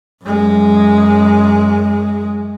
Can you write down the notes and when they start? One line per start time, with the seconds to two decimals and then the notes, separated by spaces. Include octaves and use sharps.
0.24 F#2 G#3